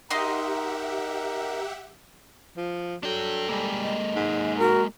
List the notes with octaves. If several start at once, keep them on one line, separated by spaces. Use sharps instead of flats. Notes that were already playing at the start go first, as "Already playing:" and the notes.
D#4 G4 A#4 D#5 E5 F#5 C6
F3
F#3 D4 A4 G5
G3 G#3 A#3
D#5
G#2
F#4 A#4